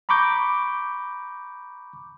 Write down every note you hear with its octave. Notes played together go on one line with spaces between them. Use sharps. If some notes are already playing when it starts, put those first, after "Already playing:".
A#5 B5 C#6 D6 G6